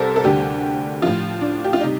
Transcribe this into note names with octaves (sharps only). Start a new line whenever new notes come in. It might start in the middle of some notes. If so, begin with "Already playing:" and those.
Already playing: C2 C3 G3 A4 A#4 C5
A4
D2 D3 G3 G4
A2 F3 F4
D4
G4
F4
C3 G3 D#4